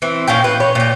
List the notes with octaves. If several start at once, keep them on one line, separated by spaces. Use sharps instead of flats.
E3 C4
A#2 C#4 F5 G5
B4
C#5
A#2 G5